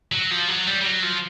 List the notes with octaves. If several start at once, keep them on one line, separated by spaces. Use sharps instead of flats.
F#3
F3
F#3
G3
G3
F#3
F3